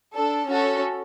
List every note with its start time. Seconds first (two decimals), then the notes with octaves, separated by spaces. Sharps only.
0.14 D4 A4
0.47 C#4 F#4 A4